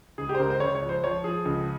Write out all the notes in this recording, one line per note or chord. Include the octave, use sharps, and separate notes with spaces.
C#2 G#4
G4
C5
C#2 A#4
C5
C#2 C#5
C#5
F3
C5
F3 C#5
F3 G#4
C#2